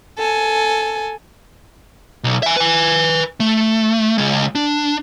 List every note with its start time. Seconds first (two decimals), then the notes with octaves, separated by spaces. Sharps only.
0.16 A4 G#5
2.24 B1
2.43 E5 G#5
2.57 B4 G#5
3.40 A3
4.18 C#3 G#3
4.55 D4